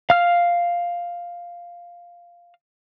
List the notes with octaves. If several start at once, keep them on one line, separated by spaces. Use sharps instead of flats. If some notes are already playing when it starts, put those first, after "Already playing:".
F5 F6